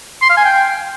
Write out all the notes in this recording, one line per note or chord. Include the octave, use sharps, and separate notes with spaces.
C6
F5
G#5
G5